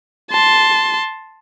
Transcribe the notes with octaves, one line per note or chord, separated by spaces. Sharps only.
A5 C6